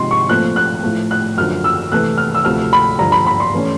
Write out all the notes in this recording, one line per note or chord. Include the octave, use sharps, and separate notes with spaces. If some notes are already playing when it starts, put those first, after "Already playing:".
Already playing: C3 F3 G#3 C4 D#4 C6
C#6
A#2 F3 A3 C4 F#6
F#6
A2 F3 A3
F#6
F#2 D3 F3 F6
E6
C3 E3 A3 F#6
F6
E6
D2 C3 F3 A3 F6
B5
G2 D3 F3 A#5
B5
B5
C6
E3 A3 C#4